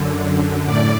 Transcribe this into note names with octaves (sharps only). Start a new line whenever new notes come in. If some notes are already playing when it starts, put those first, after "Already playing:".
Already playing: F#2 D3
A2 D5